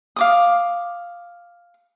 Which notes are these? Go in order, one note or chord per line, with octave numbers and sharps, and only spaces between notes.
F5 D6 D#6